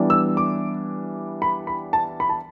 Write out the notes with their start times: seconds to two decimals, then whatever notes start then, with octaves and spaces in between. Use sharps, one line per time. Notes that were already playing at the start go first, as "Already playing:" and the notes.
Already playing: E3 G3 B3 D4
0.10 E6
0.37 D6
1.42 B5
1.67 B5
1.93 A5
2.20 B5
2.29 A5